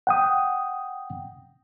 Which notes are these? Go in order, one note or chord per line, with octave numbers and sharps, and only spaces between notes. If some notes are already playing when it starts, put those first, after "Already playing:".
F#5 G5 D#6